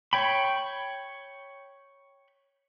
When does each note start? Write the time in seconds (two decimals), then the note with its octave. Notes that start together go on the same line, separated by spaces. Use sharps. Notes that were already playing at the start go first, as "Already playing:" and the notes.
0.13 C#5 G5 B5